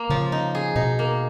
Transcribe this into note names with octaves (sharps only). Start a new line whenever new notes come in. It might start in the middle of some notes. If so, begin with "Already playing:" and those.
Already playing: A#3
C#3 F3
D#4
G#4
B2 D#4
A#3